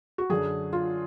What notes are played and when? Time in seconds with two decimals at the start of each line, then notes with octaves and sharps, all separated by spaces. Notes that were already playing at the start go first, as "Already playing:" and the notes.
0.18 F#4
0.30 F#2 D3 F#3 G#4
0.73 F4